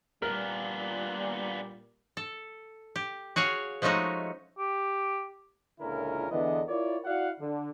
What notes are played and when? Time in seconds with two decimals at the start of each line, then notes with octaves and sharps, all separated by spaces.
0.22 A#2 G3 B3 D4 A#4
2.17 A4
2.96 G4
3.36 F#4 G#4 C#5 F5
3.82 F3 G#3 A3 C#4 D#4 F#4
4.58 G4
5.80 C#2 A#2 D3 C#4 E4 A#4
6.31 E2 D3 E3 B3 D4 D#5
6.67 E4 F4 A#4 C#5 D5
7.04 E4 F#4 D5 F5 F#5
7.40 D3